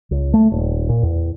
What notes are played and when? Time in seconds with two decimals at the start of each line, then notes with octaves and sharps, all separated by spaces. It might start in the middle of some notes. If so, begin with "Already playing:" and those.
0.11 C#2
0.34 A3
0.52 D#1
0.89 A#2
1.03 E2